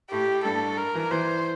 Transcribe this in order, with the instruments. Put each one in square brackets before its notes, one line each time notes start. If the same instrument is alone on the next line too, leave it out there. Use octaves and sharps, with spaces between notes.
[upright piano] A2 [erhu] G4
[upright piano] G2 [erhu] A4
[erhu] A#4
[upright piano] E3
[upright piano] E3 [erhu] C5